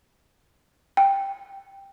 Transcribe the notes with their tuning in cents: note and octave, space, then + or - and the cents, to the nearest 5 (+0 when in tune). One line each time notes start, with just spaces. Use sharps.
G5 +5